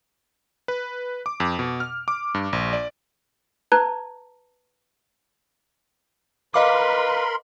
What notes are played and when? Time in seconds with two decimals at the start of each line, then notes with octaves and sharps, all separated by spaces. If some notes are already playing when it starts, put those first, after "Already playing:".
0.68 B4
1.26 D6
1.40 F2
1.59 B2
1.80 F6
2.08 D6
2.34 G2
2.53 A#1
2.73 D5
3.72 B4 A5 A#5 F#6 G#6
6.54 A#4 B4 D#5 F5 B5 C6 D6